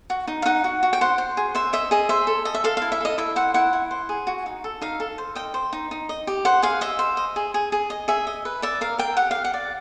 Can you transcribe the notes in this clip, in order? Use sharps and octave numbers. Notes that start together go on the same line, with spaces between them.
F#4
D#4
F5
D#4 F#5
F#4
F#4
G5
C5 F#5
C5
G#4
C5 E5
D#5 E5
G#4 D#5
C5 E5
A4
A4 D#5
E5
A4 F5
E4 F5
E5
A4 D#5
E4 E5
C5 F#5
E4 F#5
E4
C5
G#4
F#4
D#4
A4
D#4 F5
A4
C5
D#5 G5
C5
D#4
D#4
D#5
G4
C5 F#5
G#4 F5
D#5 E5
C5
D#5
G#4
G#4
G#4
D#5
G#4 E5
D#5
B4
D5 E5
A#4 F5
A#4 G5
G4 F#5
G4 F5
F#5
D5